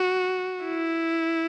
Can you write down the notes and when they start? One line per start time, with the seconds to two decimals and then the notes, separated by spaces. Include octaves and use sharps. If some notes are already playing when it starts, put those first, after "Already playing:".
Already playing: F#4
0.65 E4